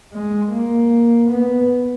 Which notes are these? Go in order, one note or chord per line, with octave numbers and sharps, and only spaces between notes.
G#3
A#3
B3